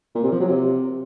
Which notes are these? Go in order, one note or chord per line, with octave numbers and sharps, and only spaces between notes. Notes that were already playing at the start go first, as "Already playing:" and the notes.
A#2
C3
F3
F#3
C3